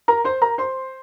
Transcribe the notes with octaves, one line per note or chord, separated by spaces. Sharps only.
A#4 A#5
C5 C6
A#4 A#5
C5 C6